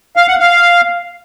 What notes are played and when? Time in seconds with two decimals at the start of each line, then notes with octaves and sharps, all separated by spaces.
0.16 F5
0.28 F#5
0.40 F5